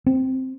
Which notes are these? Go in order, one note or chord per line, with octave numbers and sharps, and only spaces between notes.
C4